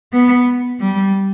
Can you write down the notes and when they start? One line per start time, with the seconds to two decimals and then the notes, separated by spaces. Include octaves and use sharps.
0.13 B3
0.80 G3